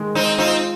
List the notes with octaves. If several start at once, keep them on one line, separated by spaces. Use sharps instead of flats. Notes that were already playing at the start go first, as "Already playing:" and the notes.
Already playing: D#3 G#3
G#3 C4 D#4
C4 D#4 F4